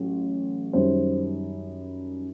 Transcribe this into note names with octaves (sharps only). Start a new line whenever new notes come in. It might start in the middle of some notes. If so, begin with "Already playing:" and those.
Already playing: A1 F#3
F#2 D#3 G3 C5